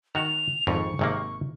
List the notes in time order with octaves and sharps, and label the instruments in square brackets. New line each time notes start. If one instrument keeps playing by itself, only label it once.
[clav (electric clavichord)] D#3 F#4 [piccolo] F7
[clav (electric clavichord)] G#1 F2 G#2 [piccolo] C#6
[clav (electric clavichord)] G#1 C3 A#3